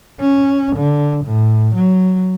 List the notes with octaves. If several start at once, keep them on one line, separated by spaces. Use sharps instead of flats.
C#4
D3
A2
F#3